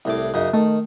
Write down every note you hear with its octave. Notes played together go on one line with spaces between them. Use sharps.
C2 A2 D6
F#2 C#3 D#4
D#3 A3